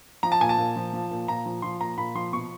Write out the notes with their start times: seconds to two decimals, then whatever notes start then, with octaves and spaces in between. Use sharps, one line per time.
0.23 F3 A#5
0.32 A5
0.41 A#2 G#5
0.49 A5
0.58 A#2
0.76 F3
0.93 F3
1.11 A#2
1.28 A#2 A#5
1.46 F3
1.62 F3 C6
1.81 A#2 A#5
1.98 A#2 B5
2.15 F3 C6
2.33 B2 C#6